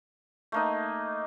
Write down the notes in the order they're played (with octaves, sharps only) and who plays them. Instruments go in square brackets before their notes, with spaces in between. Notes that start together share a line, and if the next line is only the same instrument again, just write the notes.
[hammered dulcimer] A3 A#3 D#4